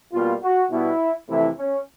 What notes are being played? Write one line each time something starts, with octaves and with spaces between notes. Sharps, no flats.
B2 G3 A#3 F4
F#4
B2 G3 B3 E4
F2 C3 E3 A3 E4
C#4